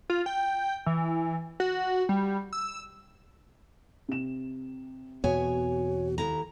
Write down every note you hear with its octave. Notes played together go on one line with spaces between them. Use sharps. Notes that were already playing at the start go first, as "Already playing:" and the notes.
F4
G5
E3
F#4
G3
E6
C3 E7
E2 B2 B3 F#4 C#5 G#5
D#2 E4 A4 A#5